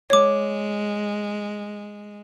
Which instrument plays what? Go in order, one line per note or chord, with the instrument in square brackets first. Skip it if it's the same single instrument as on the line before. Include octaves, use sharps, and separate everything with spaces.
[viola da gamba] G#3 [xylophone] C#5 D6